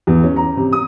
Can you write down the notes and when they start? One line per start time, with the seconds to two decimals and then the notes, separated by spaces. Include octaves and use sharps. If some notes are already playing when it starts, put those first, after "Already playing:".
0.07 E2
0.23 C#4
0.36 A#5
0.57 C3
0.73 D#6